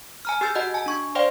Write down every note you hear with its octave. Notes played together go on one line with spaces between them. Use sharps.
G#5 A#5 F6
G4 G#4 G#5 E6 G6 A6
F#4 D#5 F#5 A5 G6
G#5 A5
D4 C#6 G#6
C5 D5 F5 G5 C6